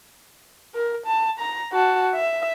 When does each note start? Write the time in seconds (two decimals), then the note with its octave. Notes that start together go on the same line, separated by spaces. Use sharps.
0.75 A#4
1.06 A5
1.39 A#5
1.73 F#4 A5
2.14 E5